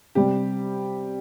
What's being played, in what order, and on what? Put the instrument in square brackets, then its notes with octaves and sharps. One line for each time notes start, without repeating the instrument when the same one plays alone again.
[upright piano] C3 G3 G4